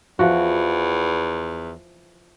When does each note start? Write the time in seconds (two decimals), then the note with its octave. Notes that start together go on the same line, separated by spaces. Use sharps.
0.19 E2 E3 F3 F#4